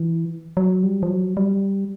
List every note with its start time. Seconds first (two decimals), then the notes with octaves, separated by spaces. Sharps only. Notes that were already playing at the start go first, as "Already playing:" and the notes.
Already playing: E3
0.57 F#3
0.83 G3
1.03 F3
1.10 F#3
1.37 G3